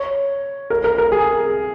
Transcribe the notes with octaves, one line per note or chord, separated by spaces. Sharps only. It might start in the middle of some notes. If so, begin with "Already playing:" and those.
Already playing: C#5
A#4
A#4
A#4
G#4